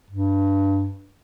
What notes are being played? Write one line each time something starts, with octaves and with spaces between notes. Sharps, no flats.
G2